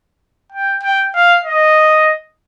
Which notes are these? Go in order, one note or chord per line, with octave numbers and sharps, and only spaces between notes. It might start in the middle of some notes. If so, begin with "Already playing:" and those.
G5
G5
F5
D#5